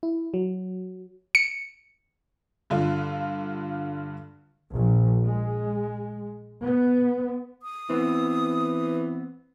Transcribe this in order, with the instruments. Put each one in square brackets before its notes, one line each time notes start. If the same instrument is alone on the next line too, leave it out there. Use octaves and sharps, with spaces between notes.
[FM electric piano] E4
F#3
[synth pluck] C#7
[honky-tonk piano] G2 D3 F4
[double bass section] A#1
G#3
B3
[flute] D#6
[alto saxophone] E3 [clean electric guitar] B3 C4